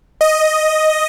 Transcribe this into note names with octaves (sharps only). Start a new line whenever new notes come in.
D#5